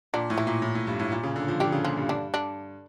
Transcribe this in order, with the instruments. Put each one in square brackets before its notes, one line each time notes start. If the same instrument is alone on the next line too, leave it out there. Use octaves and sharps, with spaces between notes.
[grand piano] A#2 [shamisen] D3 D4
[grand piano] A2
[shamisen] E3 E4
[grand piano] A#2
A2
A2
G2
A2
A#2
C#3
D3
F3
[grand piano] D3 [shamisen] G3 G4
[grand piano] C#3
[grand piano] A#2 [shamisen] F3 F4
[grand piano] G2
[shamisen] D3 D4
D3 D4